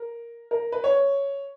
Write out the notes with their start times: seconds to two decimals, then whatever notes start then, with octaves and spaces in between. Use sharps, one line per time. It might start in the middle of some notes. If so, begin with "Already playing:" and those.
Already playing: A#4
0.51 A#4
0.72 B4
0.84 C#5